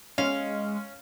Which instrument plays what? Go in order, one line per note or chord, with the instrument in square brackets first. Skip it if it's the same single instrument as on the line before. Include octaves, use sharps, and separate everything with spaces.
[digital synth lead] G#3 [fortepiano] C#4 [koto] F5